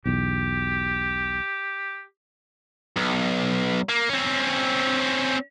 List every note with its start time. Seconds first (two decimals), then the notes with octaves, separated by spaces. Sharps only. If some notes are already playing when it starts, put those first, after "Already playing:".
0.06 B1 E2 B2 G4
2.97 B1
3.89 A#3
4.09 C4 C#4